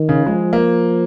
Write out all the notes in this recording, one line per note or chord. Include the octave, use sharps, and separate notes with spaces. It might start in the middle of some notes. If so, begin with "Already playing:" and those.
Already playing: D#3
C#3
F3 G#3
A#3